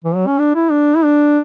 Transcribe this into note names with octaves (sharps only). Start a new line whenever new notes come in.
E3
F#3
C#4
D4
E4
D4
E4
D4